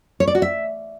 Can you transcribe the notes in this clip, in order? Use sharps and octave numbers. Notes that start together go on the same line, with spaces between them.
C#5
D5
F#4
E5